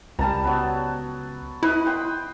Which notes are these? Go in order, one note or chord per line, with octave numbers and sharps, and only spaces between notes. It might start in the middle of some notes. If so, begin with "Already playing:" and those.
C#2 G3 A5 A#5
F#3 B3
E4 B4 D#5
G5 C6